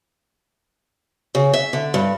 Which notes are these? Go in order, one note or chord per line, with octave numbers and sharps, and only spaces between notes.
C#3
E5
D3
G2